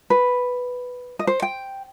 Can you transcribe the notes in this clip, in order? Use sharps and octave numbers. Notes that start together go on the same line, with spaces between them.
B4
D#5
C5
G5